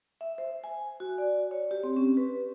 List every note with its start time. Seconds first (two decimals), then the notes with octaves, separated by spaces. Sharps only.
0.21 E5
0.38 C5
0.64 G#5
1.00 F#4
1.18 D5
1.51 C#5
1.71 G4
1.83 C4
1.97 C#4
2.17 B4